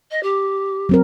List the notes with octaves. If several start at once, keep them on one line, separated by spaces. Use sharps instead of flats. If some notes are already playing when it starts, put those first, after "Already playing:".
D#5
G4
F#3 C4 A#4